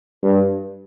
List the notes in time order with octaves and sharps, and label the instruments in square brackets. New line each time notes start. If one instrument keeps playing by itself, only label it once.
[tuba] G2